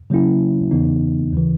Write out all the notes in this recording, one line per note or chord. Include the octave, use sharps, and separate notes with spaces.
C#3 F#3 A#3 C#4 E4
E2 C#3 E3 B3 D#4
D#2 C#3 E3